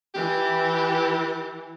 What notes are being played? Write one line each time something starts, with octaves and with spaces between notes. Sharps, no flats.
E3 G4